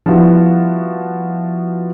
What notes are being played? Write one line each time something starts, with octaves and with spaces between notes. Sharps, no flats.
F3 G3 B3 E4 F#4